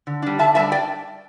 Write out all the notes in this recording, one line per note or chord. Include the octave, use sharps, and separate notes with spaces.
D3
G3 D4
D3 E5 A5
G3 D4 E5 A5
D5 G5